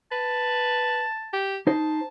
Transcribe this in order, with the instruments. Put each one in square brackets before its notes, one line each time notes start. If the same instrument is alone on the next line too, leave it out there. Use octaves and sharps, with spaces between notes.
[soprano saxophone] B4 [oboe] A5
[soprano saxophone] G4
[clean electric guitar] D#4 C5 [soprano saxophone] A5